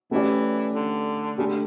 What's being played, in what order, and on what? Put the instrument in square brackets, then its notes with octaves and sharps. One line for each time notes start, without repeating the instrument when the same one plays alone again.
[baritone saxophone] E3 [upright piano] A3 C#4 G4 D5
[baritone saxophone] D3
[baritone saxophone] C#3 [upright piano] A3 D4 G4
[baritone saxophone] D3